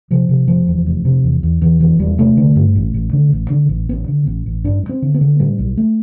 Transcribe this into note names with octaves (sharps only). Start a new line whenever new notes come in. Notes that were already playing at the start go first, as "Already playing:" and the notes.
C3 F3
C3
F1 F3
E2
F1
C3
E2
E2
E2 E3
F1 E3
E2 G3
C3 A3
D3
G2
A1
A1
D3
A1
D3
A1
A1 B3
D3
A1
A1
G2 D4
G2
C4
D3
B3
D3
A2 G3
B1
A3